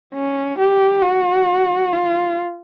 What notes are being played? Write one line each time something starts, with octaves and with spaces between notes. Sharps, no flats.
C#4
G4
F#4
F4